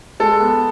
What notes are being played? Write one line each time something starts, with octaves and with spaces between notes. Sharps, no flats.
G#3 A4
B3